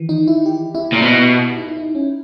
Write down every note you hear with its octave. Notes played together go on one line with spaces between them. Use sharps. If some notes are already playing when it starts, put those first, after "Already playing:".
Already playing: D#3 E3
D#4
E4
G4
E4
A#2
B2
D#4
E4
D#4
C#4